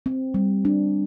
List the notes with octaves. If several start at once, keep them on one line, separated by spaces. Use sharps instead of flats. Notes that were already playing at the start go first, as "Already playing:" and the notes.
C4
G3
D4